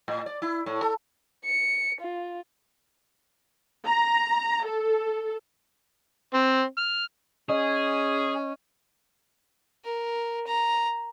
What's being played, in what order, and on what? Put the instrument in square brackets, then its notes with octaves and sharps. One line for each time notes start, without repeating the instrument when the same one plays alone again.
[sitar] A2
D5
E4
A2
A4
[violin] C#7
F4
[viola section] A#5
A4
[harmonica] C4
F6
[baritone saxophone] C#4 [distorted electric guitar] G#4 [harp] D#5
[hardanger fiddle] A#4
A#5